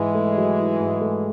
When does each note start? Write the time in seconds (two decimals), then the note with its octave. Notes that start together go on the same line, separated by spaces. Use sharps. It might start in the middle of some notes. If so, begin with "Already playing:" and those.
Already playing: G#2 E3 G#3 E4
0.15 A3
0.37 F#3
0.58 E4
0.80 G#2
1.01 A3